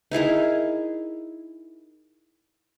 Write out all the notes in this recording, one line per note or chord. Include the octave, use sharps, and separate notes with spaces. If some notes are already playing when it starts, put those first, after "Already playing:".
D#4 E4 G#4 A#4